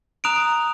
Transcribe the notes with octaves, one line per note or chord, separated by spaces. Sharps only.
A#5 D#6 F#6 D7 F7